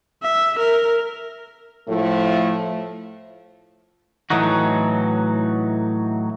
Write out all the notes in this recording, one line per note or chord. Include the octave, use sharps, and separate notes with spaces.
E5
A#4
A2 F3 A3
A2 E3 F#3 D#4 F#4